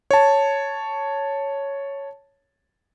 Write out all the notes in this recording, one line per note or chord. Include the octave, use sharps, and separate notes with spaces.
C#5 A5